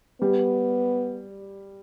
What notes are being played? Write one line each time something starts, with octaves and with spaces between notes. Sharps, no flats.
G3 B3